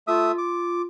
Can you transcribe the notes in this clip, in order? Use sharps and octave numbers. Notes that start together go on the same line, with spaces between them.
A3 F4 E5 D#6
D6